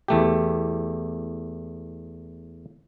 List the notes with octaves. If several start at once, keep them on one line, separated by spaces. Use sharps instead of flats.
E2 A3 G4